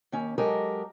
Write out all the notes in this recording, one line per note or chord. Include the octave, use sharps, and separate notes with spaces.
D#2 C#4
F#3 G#3 G4 A4 A#4 D#5